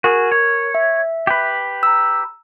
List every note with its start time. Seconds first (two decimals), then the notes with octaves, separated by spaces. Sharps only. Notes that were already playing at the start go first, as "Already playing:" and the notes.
0.04 F#4 G#4 A#4
0.32 C#5
0.75 E5
1.27 G4 B4
1.83 A#5 E6